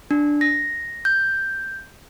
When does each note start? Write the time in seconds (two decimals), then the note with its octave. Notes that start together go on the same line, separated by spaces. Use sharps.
0.11 D4
0.41 A#6
1.05 G6